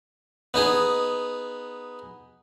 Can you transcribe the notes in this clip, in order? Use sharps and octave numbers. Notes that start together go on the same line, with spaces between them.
B3 D#4 G#4